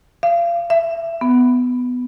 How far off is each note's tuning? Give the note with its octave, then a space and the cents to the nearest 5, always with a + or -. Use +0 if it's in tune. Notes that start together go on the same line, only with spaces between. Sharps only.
F5 -30
E5 +20
B3 +10